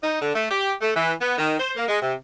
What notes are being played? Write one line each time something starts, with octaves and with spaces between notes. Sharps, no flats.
D#4
D3
A3
G4
A3
E3
B3
D#3
C5
A#3
G#3
C3